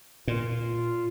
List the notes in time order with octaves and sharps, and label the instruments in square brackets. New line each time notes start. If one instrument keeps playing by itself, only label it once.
[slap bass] A#2 [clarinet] F4